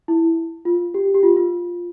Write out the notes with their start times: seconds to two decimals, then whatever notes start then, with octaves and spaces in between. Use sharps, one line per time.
0.08 E4
0.65 F4
0.94 G4
1.14 G4
1.23 F4
1.37 F4